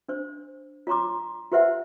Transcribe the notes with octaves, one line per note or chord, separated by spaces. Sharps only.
D4 C5
F4 C#5 A#5 C6 D6
F4 G4 B4 C5 E5 F#5